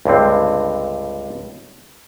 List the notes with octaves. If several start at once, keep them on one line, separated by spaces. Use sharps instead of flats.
C#2 G2 D3 C4